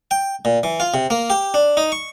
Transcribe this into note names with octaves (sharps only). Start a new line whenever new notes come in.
G5
A#2
E3
F4
C3
A#3
G4
D4
D#4
C#6